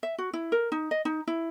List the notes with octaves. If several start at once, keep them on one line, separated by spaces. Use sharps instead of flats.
E5
F#4
E4
A#4
D#4
D#5
D#4
E4